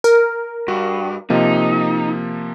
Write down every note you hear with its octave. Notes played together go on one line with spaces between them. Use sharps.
A#4
G2 F#4
C3 F3 A#3 D#4